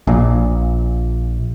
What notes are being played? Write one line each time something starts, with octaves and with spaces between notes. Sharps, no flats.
A#1 A#2